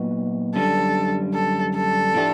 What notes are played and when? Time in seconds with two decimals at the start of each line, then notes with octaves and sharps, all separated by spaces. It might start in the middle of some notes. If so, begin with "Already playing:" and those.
Already playing: A#2 F#3 B3 D#4 F#4
0.55 F#2 D3 G3 A4
1.34 A4
1.75 A4
2.15 A2 F3 A3 D4 G4